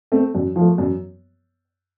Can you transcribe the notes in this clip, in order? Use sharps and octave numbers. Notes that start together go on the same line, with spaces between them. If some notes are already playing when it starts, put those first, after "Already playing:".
A3 C4
F#2
F3
A3
F#2